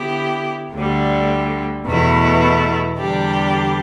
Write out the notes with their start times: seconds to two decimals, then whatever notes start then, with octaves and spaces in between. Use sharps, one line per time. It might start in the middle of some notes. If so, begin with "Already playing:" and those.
Already playing: D3 B3 E4 G4
0.73 D2 D3 G3
1.86 E2 B2 A3 E4
2.98 E2 D3 G3 D4 G4